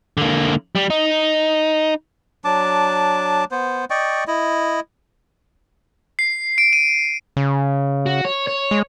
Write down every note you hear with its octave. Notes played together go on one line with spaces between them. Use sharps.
D3 A#3
G3
D#4
F#3 D4 A5 D6
B3 C5
D5 D#5 G5 C#6
E4 D#5
C7
D7
D#7
C#3
F#4
C#5
C#5
G#3